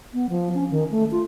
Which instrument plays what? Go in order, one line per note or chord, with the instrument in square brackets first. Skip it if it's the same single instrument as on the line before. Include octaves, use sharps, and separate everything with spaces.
[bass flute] B3
F3
C#4
D#3
A3
F4